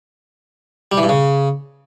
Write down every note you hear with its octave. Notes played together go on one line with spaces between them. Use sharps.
G3
E3
G2
C#3